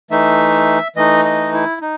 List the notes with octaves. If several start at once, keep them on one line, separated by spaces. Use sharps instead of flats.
E3 A3 D#4 E5
E3 A3 D#4 D#5
D#5
E4
D#4